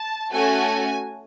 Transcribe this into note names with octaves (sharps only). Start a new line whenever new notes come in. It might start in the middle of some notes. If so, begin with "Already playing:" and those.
Already playing: A5
A3 C#4 F#4 A4 G#5